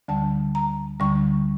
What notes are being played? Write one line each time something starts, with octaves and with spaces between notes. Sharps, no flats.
D2 D3 G3 A5
A#5
D2 D3 G3 C#6